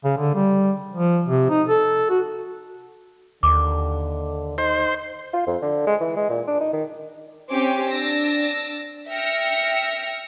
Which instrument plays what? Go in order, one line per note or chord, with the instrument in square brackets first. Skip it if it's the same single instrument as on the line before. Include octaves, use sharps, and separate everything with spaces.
[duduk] C#3
D3
G3
F3
C3
D#4
A4
F#4
[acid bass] D#2 [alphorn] D3 [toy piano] D6
[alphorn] D#4 [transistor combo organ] C5
[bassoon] F4
F2
D3
G#3
E3
G#3
A#2
D4
D#4
D#3
[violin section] C4 C#4 G4 C#5 G#5 D6
D4 E6 A6 A#6
E5 G5 E6 F6 A#6 C#7